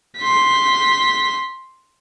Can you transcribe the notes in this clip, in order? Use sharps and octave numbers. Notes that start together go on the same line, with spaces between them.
C6 B6